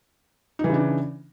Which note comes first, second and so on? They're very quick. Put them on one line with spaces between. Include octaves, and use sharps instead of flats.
D#4 E3 C#3 D4